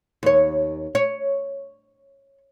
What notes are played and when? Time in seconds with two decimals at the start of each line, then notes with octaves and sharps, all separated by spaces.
0.23 D#2 C#5
0.95 C#5